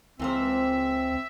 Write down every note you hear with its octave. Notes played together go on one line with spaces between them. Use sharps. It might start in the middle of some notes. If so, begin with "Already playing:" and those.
C#2 E3 A#3 C4 C5 E5